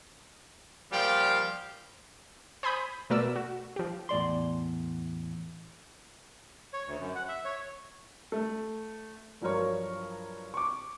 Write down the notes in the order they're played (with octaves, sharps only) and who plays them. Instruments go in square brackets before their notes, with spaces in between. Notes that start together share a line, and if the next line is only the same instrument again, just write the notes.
[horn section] A#2 F3 G3 F5 G5
[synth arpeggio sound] C5 G#5 B5 D#6 G6
B2 A3 A#4 B4 D5 E6
F#4
F3 G4
[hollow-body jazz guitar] E2 A2 D5 C6
[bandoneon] C#5
D2
F#2
F#5
E5
C#5
[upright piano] A3
G2 F3 F#3 A#4 C#5 C#6
C#6 D6